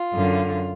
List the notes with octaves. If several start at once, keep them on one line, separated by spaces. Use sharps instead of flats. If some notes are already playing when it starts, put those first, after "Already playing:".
Already playing: F4
F#2 D3